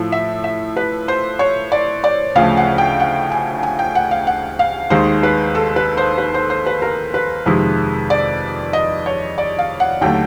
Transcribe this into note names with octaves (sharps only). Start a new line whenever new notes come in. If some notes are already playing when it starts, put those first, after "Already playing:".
Already playing: A2 F3 A3
E5
E5
B4
C5
C#5
D5
D5
D2 C#3 F3 A3 F5
F#5
G5
F#5
G#5
G#5
G5
F#5
F5
F#5
F5
D#2 D#3 G#3 C5
B4
A4
B4
C5
B4
C5
C5
B4
A#4
B4
F2 C3 D#3 G#3
D5
D#5
C#5
D5
F5
F#5
D#2 D3 F#3 A3 G5